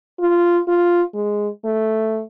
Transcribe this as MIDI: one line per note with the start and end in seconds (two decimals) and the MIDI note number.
0.20 0.60 65
0.68 1.02 65
1.14 1.48 56
1.65 2.23 57